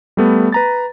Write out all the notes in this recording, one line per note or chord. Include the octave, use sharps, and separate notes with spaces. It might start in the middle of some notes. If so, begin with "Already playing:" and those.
G3 A3 B3
B4 A#5 A6